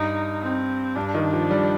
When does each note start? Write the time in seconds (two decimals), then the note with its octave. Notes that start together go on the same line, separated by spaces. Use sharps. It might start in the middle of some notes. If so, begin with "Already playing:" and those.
Already playing: G2 D#4
0.42 C4
0.96 G2 D4
1.14 D#3
1.33 F3
1.51 G3